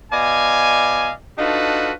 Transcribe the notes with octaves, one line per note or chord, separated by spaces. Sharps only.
B2 D5 D#5 F5 G#5
D4 D#4 F4 F#4 A4 B4